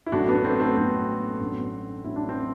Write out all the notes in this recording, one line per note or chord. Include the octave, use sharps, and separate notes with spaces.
E4
A1 G2 D3 F#3 D4 F#4
B3 D4
A3 C4
A3 C4
A1 G2 D3 F#3 A3 C4
A1 G2 F#3
A1 G2 F#3 E4
D4
C4